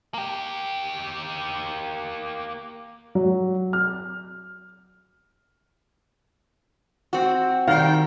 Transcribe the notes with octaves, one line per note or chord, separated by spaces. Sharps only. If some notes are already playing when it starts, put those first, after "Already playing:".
A#3 G4
F#3
F6
C4 F#4
D#3 G3 F5 G5